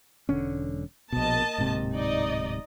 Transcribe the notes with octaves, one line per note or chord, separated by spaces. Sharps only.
E1 D3 C#4
A#1 B2 A#3 D#5 A5
D1 G#2 C3
D#4 D5 D#5